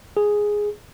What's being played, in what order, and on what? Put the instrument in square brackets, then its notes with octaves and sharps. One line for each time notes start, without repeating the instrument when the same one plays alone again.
[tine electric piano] G#4